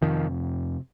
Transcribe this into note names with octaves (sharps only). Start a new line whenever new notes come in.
F2 C3 D#3 F3